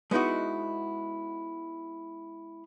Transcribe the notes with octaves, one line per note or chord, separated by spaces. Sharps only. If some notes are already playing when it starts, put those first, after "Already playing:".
G#3 B3 D#4 E4 F#4